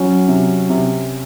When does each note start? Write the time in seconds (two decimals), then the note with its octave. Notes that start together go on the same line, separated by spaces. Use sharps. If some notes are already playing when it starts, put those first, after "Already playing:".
Already playing: F#3 C#4
0.28 C3
0.69 C3